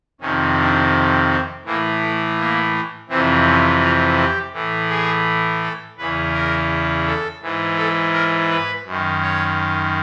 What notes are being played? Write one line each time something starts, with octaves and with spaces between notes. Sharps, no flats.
F2 C3 D#3 C#4
D4
C4
A2 E3 A#3
A3
A#3
F2 C3 E3 C4
C#4
F4
G4
A2 E3
G#4
A4
E2 C#3 E3 B4
A#4
A4
G#2 E3
A4
A#4
B4
F#2 D#3
C#5